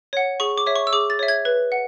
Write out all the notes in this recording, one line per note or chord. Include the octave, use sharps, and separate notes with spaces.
C#5 F#5
G#4 C#6
D6
C#5 E5
C#6
E6
G#4 D6
A6
C#5 E5
G#6
B4
F#5